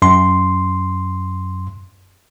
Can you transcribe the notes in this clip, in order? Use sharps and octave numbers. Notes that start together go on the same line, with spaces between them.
F#2 C6